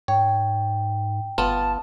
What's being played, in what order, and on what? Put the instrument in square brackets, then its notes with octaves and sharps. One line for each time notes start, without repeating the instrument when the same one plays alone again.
[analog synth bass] G#2 [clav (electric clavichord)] C#5 [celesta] G5
[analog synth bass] G1 [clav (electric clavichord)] B3 F4 [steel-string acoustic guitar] A5